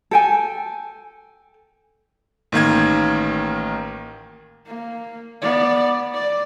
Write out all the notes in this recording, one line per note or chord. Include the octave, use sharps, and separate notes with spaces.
A4 G5 G#5
A1 D#3 A#3 G#6
A#3
B3 D5
D5